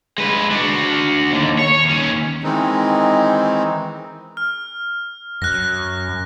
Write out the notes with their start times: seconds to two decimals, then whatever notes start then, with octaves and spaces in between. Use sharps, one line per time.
0.18 G#3 B4
0.51 D4 F#4
1.32 D#2 D3
1.59 C#5
1.85 D#2 C#4
2.43 D#3 E3 G#3 C4 D#4
4.37 F6
5.42 F#2 F#6 A#6